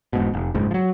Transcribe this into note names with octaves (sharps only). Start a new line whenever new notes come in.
E1 G#2 B2
F1
F#1 C#2 G#2
F3 F#3